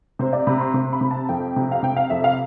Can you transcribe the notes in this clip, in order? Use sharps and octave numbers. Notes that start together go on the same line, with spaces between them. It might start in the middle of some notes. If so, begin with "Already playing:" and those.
C3 C5
D5
C3 B5
C6
C3 C6
B5
C3
A5
F2 G5
C3
F5
C3 G5
F5
F2 E5
F5